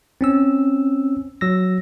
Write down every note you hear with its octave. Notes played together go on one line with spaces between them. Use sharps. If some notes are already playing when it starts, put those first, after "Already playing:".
C4 C#4 E6
F#3 E6 A#6